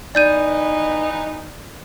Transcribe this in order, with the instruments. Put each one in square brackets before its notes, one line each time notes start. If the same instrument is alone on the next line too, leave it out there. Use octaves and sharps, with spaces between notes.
[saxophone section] E3 B3 D#4 [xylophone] D5 G6 D#7